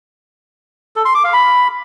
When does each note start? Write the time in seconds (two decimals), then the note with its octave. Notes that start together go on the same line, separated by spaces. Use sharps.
0.96 A4
1.05 C6
1.15 D6
1.24 F5
1.33 B5